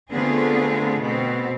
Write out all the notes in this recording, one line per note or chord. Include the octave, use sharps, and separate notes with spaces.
D3 A3 B3 C4 F4 G#4
B2 B3 C4